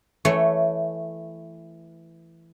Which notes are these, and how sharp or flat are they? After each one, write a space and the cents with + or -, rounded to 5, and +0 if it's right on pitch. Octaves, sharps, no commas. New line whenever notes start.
E3 +15 A3 +0 C#5 +0